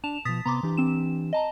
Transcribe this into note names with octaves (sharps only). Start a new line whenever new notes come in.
D4 A5 E7 F7
B2 F3 D#6 A6 B6
C3 B3 A#5 C6 D6
E3 D4 G4
C4 E7
D#5 A5 A#5